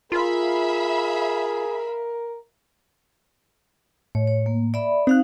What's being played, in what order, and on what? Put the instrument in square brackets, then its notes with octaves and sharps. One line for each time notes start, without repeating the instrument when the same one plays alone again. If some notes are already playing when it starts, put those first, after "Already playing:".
[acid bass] F4 [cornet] G#4 [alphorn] A#4 [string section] E5 F5 B5
[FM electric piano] A2 [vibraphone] C#5
[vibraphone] C#5
A#3
D5 E5 B5
[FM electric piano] C4 F#6 [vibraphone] D#4 F5